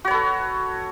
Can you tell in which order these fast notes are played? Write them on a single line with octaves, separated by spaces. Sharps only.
F#4 C#5 B4 A4